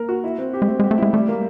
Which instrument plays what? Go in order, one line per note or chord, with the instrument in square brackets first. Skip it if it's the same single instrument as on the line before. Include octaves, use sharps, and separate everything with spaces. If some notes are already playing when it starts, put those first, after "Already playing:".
Already playing: [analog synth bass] A#3 [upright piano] A#4
[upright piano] F#4
E4
C4
G4
[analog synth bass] G#3
[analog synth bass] A3 [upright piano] C4
[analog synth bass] G#3
[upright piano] G4
[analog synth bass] A3
[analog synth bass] G#3 [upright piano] E4
[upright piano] G3 [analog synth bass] A3
[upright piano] A#3